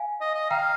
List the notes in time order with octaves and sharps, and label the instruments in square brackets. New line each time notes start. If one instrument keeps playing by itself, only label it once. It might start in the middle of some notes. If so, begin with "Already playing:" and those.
Already playing: [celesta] F5 G#5
[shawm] D#5
D#5
[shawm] F5 [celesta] G5 A#5